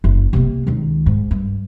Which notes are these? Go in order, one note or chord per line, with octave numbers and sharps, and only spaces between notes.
F#1
C3 A#3
C#2 D#3
G#2
G2